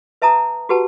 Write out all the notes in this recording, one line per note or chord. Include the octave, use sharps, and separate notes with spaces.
B4 E5 A5 A#5 D#6
F#4 G4 B4 F#5 A5